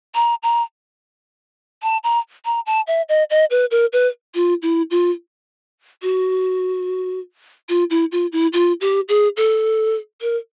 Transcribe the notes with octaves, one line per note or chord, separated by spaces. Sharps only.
A#5
A#5
A5
A#5
A#5
A5
E5
D#5
D#5
B4
A#4
B4
F4
E4
F4
F#4
F4
E4
F4
E4
F4
G4
G#4
A4
A#4